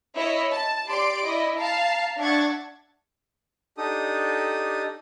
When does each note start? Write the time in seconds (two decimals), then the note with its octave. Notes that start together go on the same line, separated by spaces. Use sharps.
0.14 E4 C#5 D#5
0.51 A5
0.89 G4 D5 C6 D6 D7
1.24 E4 D5 D#5
1.57 F5 A5 A#5
2.18 D4 E5 F#5 C#6 G#6 A6
3.78 D4 D#4 G4 A4 D#6